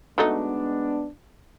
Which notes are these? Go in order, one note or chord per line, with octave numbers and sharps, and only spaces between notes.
F#3 G#3 A3 B3 D4 D#4